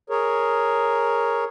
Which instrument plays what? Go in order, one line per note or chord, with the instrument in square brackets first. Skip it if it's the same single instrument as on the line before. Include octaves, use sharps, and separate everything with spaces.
[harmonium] G#4 A#4 C#5